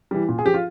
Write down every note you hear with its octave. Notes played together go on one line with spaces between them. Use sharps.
E3 G3
A#2
G#4
F3 G4
F4